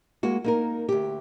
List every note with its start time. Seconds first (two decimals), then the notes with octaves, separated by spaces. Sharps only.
0.23 G#3 A#3 F#4
0.44 A#3 D#4 A#4
0.89 D2 G4